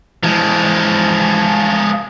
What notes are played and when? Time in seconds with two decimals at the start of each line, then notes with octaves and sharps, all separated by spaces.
0.23 E3 F3 G#3